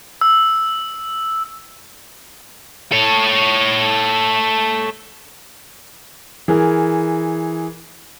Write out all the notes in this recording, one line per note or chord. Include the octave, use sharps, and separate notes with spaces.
E6
A4 C#5
E3 G#4 A#4